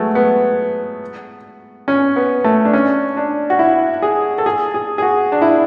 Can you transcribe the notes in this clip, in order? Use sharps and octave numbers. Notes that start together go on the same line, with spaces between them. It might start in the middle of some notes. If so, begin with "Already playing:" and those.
Already playing: F#3 G#3 A3 B3
B3
C#4
B3
A3
D4
C#4
D4
F#4
E4
G#4
A4
G#4
G#4
G#4
F#4
D4
E4